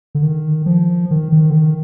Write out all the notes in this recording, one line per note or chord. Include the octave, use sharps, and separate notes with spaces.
D3
D#3
F3
D#3
D#3
D3
D#3